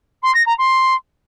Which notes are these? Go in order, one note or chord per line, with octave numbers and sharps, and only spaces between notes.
C6
A#6
A#5
C6